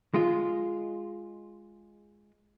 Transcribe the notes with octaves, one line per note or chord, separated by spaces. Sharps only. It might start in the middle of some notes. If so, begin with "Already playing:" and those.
G#3 F4